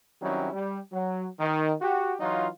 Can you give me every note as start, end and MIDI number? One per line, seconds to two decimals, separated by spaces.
0.22 0.51 51
0.22 0.51 54
0.22 0.51 55
0.22 0.51 60
0.22 0.51 61
0.22 0.51 64
0.52 0.78 55
0.92 1.26 54
1.39 1.73 51
1.81 2.14 66
1.81 2.14 67
2.20 2.48 52
2.20 2.48 54
2.20 2.48 63
2.20 2.48 65